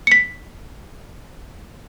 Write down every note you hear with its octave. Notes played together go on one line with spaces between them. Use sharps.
B6 C#7